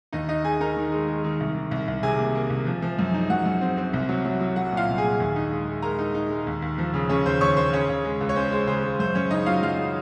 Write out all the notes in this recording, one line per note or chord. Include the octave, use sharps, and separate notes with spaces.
D#2 D#4 D#5
D#4 D#5
D#4 G#4 G#5
D#4 A#4 A#5
D#3
G#3
G#3
D#3
C2
D#3
C2
C2
C3 G#4 G#5
A#3
A#3
C2
F3
F3
F#2
D#4
F#2 F#4 F#5
F#2
C4
C4
C2
F#3
F#3
F#3
F#3 F#4 F#5
A#2
F4 F5
C2
G#4 G#5
A#2
D#2
D#4
G#3
G#3
G#3 A#4 A#5
D#4
D#4
G#3
D#2
D#2
F3
C#3
C#3 C#4 C#5
D#2 C5 C6
D#2 C#5 C#6
D#2 C5 C6
C#3 C#4 C#5
C#3
G#3
C#2
C#5
C#4 C5
G#3 C5
C#3 C5
G#3
F#2 C5
F#2 C#4 C#5
C#3 D#4 D#5
F#3 F4 F5
F#2 F4 F5
C#3